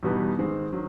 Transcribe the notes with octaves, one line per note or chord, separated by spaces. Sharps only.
E2 B2 G3 B3 D#4
G#2 D#3 G#3 C4
D#3 F#3